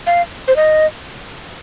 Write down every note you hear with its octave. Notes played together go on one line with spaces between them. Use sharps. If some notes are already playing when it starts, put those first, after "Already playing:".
F5
C5
D#5